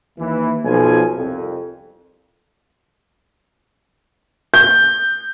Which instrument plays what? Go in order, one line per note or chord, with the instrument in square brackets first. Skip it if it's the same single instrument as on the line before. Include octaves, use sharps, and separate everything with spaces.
[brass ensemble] D#2 E3
B1 F3 G#5
C2 F2
[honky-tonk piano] G6